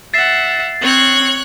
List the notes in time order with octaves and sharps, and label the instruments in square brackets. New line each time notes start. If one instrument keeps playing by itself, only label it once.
[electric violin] E5 F#5 [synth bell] A6 C7
[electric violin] C4 [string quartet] C#5 F#6 G#6